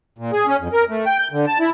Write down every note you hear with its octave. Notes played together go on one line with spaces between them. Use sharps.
A#2
G#4
C#4
F2
A#4
A3
G5
G6
D3
A5
E4